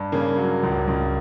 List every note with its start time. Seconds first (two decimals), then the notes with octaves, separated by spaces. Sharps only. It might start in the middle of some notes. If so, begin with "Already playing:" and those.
Already playing: G2
0.12 C#3 A#3
0.37 F#3
0.63 C#2
0.87 C#2